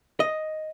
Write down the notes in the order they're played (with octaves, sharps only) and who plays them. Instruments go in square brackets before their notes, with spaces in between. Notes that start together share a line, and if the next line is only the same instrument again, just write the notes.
[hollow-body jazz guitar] D#5